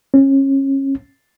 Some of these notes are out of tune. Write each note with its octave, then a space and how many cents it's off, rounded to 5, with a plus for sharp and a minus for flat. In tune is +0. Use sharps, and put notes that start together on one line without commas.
C#4 -30